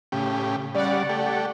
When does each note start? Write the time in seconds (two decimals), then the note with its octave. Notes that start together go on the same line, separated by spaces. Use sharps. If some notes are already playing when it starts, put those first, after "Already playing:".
0.12 A2 C#3 G4
0.75 C#3 G3 D5 F#5
1.09 A3 G4